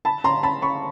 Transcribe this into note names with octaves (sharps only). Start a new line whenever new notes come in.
A5 B5
A#5 C6
A5 B5
B5 C#6